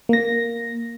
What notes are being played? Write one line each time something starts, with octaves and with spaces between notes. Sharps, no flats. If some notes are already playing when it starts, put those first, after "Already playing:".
A#3 A#6